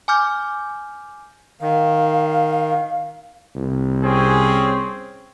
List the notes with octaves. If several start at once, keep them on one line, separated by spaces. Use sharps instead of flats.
G#5 D6 F6 G6
D#3 F5
C2
C4 C#4 G#4